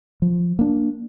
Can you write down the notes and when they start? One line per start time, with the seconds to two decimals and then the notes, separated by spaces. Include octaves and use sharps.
0.22 F3
0.59 A#3 D4